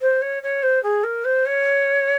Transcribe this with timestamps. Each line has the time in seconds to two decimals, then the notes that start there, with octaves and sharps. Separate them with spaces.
0.01 C5
0.21 C#5
0.43 C#5
0.62 C5
0.83 G#4
1.03 A#4
1.24 C5
1.46 C#5